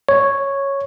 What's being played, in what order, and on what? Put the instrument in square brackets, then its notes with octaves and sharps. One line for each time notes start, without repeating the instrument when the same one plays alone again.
[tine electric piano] C#5